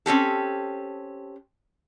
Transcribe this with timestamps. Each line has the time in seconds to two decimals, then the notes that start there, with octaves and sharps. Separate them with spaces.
0.06 C4 C#4 G4 A4